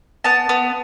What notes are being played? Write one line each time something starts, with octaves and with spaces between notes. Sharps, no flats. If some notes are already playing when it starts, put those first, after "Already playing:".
B3 A5
B3